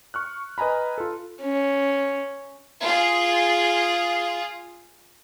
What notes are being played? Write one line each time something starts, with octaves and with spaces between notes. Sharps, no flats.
C#6 F6 F#6
B4 D#5 G#5 A#5 B5
F4 A4
C#4
F4 G#4